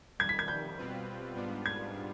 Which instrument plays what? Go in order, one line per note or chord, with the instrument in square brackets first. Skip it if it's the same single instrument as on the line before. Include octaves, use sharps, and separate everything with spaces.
[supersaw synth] F2 D#3 G3 [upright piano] G#6
[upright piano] B6
G#6
G6
[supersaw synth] B2 G3 C4 F4 B4
G#2 G3 B3 D4 F4
[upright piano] G#6